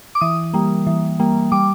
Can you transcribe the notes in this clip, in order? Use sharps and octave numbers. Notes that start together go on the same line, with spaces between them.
D6
E3 D#6
G3 A#3
E3
G3 A#3
G3 D6